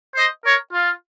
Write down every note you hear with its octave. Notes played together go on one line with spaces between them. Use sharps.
C5 D#5
A#4 C#5
F4